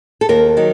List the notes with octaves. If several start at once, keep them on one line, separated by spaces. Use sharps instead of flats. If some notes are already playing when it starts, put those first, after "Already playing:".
A4
D#2 A#4
D#3 F#3